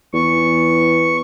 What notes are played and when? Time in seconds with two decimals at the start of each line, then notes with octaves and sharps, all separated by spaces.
0.13 E2 C#6